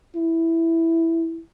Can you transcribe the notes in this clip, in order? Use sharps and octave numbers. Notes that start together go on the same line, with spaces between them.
E4